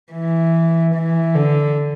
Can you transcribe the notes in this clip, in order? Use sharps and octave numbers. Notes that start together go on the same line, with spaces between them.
E3
E3
D3